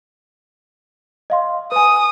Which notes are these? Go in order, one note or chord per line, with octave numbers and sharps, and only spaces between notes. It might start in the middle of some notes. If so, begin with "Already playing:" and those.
D#5 F5 C6
B4 G#5 D#6